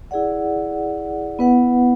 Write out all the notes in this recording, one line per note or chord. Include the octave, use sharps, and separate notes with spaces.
E4 G#4 D5 F#5
B3 E4 B4 F#5